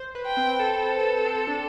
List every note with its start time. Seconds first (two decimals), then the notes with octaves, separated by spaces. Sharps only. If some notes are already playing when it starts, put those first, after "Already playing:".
Already playing: C5
0.15 B4
0.26 G5
0.37 C4
0.59 A4
1.25 C4
1.47 D4